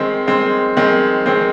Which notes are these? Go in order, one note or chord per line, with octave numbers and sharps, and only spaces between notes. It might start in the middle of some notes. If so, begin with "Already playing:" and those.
Already playing: D#3 G#3 C4
D#3 G#3 C4
D#3 G#3 C4
D#3 G#3 C4